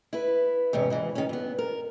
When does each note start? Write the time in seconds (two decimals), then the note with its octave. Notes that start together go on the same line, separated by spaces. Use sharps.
0.13 E4 B4
0.73 E2 G#2 C3 C#4
0.90 G#2 C#3 E3
1.15 D#3 C#4
1.29 G2 B3
1.59 A#4